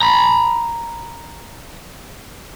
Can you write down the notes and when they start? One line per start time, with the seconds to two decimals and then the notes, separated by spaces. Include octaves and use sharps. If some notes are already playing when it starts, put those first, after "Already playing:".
0.02 A#5 B5